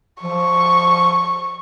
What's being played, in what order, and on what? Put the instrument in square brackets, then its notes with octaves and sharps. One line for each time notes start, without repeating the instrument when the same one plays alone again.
[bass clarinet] F3 [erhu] C#6